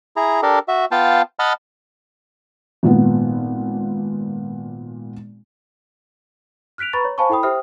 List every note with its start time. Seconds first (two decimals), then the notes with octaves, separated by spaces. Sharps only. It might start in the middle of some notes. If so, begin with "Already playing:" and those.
0.16 E4 G#4 A#5
0.43 D4 G4 A4 A#4
0.68 F#4 E5
0.91 B3 F4 F5 G5 A5
1.39 D#5 F#5 A5 B5 F6
2.83 G#1 A#2 B3
6.78 F6 F#6 B6 D7 F7
6.93 B4 A#5 B5 C#6 A6
7.05 C#5
7.18 C5 F5 G#5 A5 B5 C#6
7.29 E4 A4 G5 B5 D#6
7.43 G4 C5 E5 G5 D#6 F6